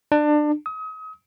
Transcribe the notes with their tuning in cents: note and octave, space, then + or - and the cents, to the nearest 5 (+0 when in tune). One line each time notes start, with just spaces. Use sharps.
D4 +25
D#6 +35